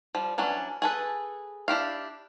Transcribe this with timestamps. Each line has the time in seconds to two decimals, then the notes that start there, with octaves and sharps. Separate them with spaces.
0.15 F3 G3
0.38 E3 F#3 C#4 D4
0.82 G#4 A4 B4
1.68 D4 E4 G4 F5